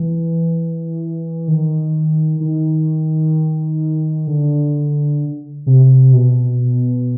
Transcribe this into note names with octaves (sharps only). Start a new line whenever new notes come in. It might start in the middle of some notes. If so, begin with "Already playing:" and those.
Already playing: E3
D#3
D#3
D3
C3
B2